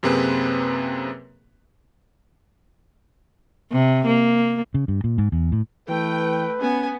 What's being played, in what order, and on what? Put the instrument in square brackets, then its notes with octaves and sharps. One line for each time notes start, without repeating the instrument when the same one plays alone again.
[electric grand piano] F#2 C3 A#3 C4 G#4 B4
[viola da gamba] C3
A#3
[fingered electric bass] C#3
G2
A#2
G#2
E2
A2
[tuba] E3 [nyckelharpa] A3 [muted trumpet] B4 [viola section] G5
[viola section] B3 [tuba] C#4 [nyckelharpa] G#5